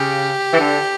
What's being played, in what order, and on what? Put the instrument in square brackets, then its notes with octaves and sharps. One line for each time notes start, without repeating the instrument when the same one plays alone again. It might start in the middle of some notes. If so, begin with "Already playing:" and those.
Already playing: [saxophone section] C#3 [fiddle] G4
[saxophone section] E3
D3